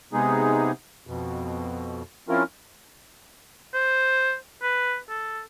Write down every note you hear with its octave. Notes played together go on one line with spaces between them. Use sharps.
C3 G#3 B3 D#4 G#4
F2 B2
F3 C4 C#4 E4 F4 A#4
C5
B4
A4